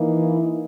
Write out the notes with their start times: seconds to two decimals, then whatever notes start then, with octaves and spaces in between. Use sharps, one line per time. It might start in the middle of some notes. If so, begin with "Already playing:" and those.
Already playing: E3 A#3 D#4
0.19 E4